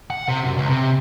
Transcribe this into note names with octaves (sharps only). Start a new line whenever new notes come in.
F#5
C3
F#2
C#2
C3